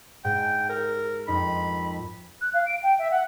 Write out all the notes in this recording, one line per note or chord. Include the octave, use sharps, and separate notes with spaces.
G#2 G5
A#4
F2 D#4 A#4 B5
F#6
F5
D7
G5
E5
F#5